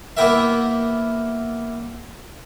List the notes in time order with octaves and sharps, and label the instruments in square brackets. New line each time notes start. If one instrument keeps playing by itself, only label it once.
[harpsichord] A#3 B3 E4 G4 A#4 E5